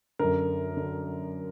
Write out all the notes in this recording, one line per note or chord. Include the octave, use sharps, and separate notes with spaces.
F#2 D3 A#4
D3